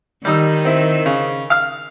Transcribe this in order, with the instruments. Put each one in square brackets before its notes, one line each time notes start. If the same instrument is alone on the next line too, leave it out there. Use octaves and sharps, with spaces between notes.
[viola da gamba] D#3 [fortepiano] G3 D#4 E6
[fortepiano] C4 E4
C#3
F5 F6